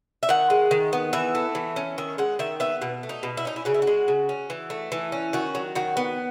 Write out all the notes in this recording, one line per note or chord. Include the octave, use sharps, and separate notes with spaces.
E5
D#3 F#5
G#3
D#3
B3
E3 E5
A3
E3
C#4
D#3 E5
G#3 F#5
D#3 E5
B3 E5
B2
A3
D#4
B2
E4
C#4 D#4
E4
C#3 F#4
E4
F#4
G#3
C#3
C#4
E3
A3
E3
C#4
D#3 F#4
F#3
D#3 F#4
B3